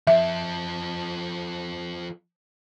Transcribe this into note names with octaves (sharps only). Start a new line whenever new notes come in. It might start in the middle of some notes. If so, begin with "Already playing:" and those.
F3 A4 E5